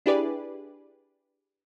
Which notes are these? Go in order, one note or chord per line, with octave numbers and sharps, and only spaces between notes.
D4 E4 G4 G#4 B4 D5